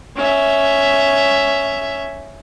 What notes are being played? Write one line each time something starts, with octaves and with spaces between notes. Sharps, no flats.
C#4 E5